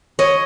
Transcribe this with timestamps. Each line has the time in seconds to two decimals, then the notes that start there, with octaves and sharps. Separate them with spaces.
0.19 C#5 D#5